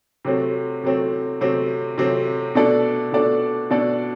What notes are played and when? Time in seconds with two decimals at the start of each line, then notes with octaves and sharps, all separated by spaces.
0.25 C3 F#3 A3 C4
0.83 C3 F#3 A3 C4
1.41 C3 F#3 A3 C4
1.98 C3 F#3 A3 C4
2.55 B2 A3 D4 A4 D5
3.12 B2 A3 D4 A4 D5
3.70 B2 A3 D4 A4 D5